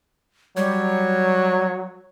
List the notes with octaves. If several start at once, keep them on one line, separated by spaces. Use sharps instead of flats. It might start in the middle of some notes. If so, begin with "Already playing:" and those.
F#3 G3 C#5